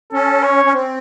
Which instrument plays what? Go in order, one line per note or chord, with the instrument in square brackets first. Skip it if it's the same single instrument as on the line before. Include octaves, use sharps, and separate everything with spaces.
[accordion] C#4 [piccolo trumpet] A4
[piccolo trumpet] C#5
[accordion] C#4
C4